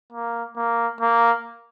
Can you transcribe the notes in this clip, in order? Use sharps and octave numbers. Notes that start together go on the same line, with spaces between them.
A#3
A#3
A#3